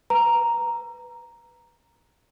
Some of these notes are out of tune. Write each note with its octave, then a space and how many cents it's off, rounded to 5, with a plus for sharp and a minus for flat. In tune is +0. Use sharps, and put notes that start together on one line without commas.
B4 +0 A#5 +0